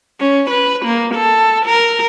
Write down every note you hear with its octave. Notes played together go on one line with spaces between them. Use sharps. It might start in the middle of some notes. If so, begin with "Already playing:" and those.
C#4
B4
A#3
A4
A#4